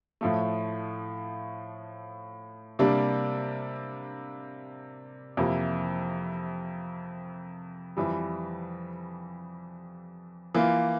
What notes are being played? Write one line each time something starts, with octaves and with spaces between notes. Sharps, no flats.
A2 F3 A3
C3 G3 A#3 D4
F2 C3 E3 A#3 E4
F2 E3 G3
E3 A#3 F4